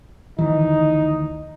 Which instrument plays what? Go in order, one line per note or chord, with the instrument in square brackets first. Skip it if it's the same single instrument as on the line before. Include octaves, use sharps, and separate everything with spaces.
[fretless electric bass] D2 D#3 E3 [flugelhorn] D#4